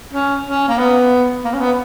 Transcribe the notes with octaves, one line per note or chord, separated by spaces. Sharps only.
C#4
C#4
A#3
B3
A#3
C#4
B3